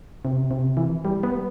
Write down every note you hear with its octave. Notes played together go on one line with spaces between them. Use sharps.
C3
C3
E3
G3
B3